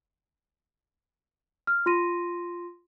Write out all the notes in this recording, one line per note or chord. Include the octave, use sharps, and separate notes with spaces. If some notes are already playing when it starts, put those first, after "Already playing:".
F6
F4 C6 A#6 D#7